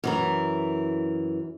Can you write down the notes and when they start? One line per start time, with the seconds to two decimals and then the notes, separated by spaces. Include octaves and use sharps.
0.04 F#2 E3 A#4